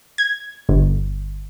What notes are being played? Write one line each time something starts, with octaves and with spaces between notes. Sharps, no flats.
G#6
G1